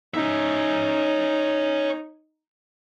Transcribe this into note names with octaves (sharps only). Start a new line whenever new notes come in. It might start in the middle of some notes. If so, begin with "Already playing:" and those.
C#4 D#4 E5